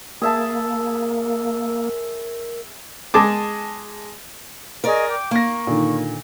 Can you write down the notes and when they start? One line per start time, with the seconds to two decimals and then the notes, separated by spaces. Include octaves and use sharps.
0.22 A#3 G#4 A#4 E5 A5
3.14 G#3 G#4 A5 D6
4.84 G#4 A#4 D5 D#5 C#6
5.09 G5 D6
5.31 A#3 F5 C#6 A#6
5.67 A#2 D3 D#3